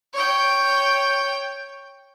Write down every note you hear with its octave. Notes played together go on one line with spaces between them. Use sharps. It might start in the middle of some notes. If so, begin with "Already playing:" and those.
C#5 G5